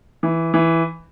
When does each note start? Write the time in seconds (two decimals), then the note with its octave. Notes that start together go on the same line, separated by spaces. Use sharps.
0.23 E3
0.54 E3